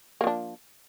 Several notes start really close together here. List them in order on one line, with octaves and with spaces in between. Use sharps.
A#3 F3 D4